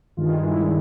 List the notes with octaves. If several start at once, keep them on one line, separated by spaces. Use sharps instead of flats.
G2 D#3 G#3 F4
E4
D4